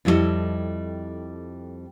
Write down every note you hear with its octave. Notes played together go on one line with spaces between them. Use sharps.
F2 G3 E4 F4 A4 D#5